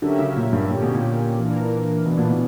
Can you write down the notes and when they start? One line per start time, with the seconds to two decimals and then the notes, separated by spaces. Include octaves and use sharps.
0.02 D3 F#3 C#4 G4 A#4 E5
0.19 C#3
0.36 A#2
0.53 G2
0.70 A#2 D3 A#3 C#4 G4
0.82 B2
0.95 A#2
1.38 E3 A#3 D4 A#4
2.06 B2 E3 B3 D4
2.18 A#2
2.30 B2